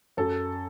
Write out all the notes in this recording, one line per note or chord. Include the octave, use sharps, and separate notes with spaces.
F#2 A4